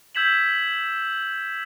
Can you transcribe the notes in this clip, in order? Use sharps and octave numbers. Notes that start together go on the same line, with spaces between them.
E6 G6 G#6 B6 E7 F#7